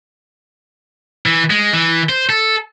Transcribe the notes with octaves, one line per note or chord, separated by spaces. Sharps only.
E3
G#3
E3
C5
A4